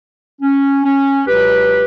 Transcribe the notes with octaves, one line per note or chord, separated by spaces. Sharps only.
C#4
C#4
C#2 B2 F#3 G4 B4